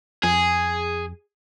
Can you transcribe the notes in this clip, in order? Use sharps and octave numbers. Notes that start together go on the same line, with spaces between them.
F2 G#4